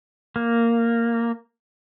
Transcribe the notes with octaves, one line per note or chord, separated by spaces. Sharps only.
A#3